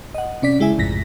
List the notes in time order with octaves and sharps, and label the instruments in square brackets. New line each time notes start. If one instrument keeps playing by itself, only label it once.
[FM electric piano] D#5 F#5
C3 C#4 D5 B6
C#3 G#3 E4 E5 G#5
A1 F2 G#2 C3 A#6 B6